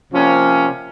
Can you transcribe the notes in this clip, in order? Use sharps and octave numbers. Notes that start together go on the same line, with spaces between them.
C3 F3 A#3 C#4